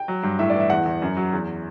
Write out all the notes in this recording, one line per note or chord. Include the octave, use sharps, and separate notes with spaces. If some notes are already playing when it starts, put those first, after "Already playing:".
Already playing: G5
F#3
G2
A2 E5
D5
E3
E5
E2 F#5
E2
F#2
F#3
E2